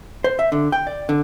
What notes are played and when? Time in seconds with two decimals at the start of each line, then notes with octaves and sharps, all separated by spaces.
0.24 C5
0.39 E5
0.52 D3
0.72 G5
0.87 D5
1.09 D3